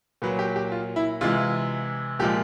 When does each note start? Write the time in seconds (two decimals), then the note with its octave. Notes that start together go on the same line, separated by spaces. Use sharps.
0.22 A#2 F#3 B4
0.39 G4
0.56 G4
0.72 F4
0.96 E4
1.21 C3 E3 G#3 F4
2.19 A#2 F3 G#3 G4